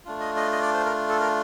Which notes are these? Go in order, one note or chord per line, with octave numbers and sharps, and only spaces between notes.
A3 D4 F4
D#5
D#5
D#5
D5
C5
A#4
A4
A#4